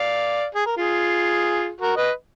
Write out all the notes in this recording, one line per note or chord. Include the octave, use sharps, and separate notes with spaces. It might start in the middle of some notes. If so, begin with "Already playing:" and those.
Already playing: D5 F5
G#4
A#4
F4 G#4
F#4 A#4
B4 D#5